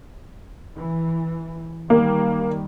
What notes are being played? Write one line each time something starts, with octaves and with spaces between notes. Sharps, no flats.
E3
D#3 G3 A#3